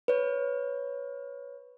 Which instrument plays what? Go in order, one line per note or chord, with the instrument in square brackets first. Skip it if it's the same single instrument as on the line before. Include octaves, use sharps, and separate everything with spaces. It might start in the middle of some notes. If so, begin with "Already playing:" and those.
[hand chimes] B4 C#5